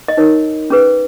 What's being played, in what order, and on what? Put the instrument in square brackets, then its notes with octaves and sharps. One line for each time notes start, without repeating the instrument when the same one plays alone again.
[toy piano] D#5
D#4 A#4 C#5
C#4 G#4 B4